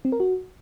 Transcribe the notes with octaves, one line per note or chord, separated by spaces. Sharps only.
C4
A#4
F#4